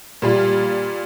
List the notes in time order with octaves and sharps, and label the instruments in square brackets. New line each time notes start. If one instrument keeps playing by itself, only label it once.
[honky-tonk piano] A#2 G3 F4